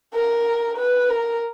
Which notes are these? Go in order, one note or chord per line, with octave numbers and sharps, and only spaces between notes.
A#4
B4
A#4